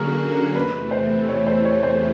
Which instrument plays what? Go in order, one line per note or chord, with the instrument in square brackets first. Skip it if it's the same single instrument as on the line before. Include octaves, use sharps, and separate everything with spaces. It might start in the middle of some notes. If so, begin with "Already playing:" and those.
Already playing: [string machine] D3 F#3 A#3 C#4 F#4 [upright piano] G#4 A#4
[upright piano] A#4
[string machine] E2 C3 E3 A3 [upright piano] B4
[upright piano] C5
C#5
C5
C#5
C5